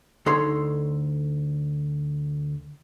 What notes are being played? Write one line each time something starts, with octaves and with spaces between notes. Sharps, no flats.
D2 D#4 A4 C#5 C6